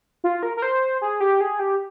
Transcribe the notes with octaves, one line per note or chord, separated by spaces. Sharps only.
F4
A#4
A#4
C5
G#4
G4
G#4
G4